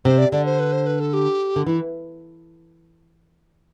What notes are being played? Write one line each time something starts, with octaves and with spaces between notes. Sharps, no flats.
C3 C5
D5
D3 D5
C5
B4
C5
B4
A4
G4
D3
E3 E4